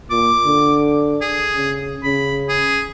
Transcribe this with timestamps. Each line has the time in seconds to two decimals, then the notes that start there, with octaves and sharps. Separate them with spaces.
0.11 A#2 D6
0.46 D3
1.22 G#4
1.55 C#3
2.04 C#3 B5
2.49 G#4